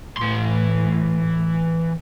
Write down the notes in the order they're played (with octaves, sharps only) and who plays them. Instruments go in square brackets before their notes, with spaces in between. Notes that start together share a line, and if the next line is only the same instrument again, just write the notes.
[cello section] A2 [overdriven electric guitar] E3 C6